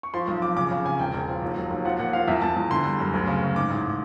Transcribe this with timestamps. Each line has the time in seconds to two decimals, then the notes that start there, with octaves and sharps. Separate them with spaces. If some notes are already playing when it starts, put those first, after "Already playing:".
0.03 C#6
0.14 F3 C6
0.27 B1
0.42 F3 D6
0.56 C#3 D6
0.71 C#3
0.85 C#3 G#5
0.99 E1 G5
1.13 E1
1.28 F3
1.42 D#2
1.56 F#3
1.70 D#2
1.85 F3 F#5
1.99 A#2 F#5
2.13 F3 F5
2.28 E2 E5
2.42 E2 A5
2.56 E2
2.71 D3 C6
2.85 G3
3.00 F#2
3.14 D2
3.27 C#3
3.42 D2
3.56 G#2 D6
3.70 A1